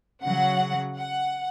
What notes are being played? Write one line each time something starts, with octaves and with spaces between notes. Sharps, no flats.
C#3 F#3 F#5
F#5